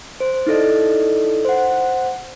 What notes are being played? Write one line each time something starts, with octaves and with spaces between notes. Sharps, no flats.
C5
D#4 E4 A4 D5 D#5
C5 F#5